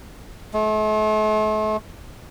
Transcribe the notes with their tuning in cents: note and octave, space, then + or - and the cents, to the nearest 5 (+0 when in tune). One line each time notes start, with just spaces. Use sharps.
A3 -40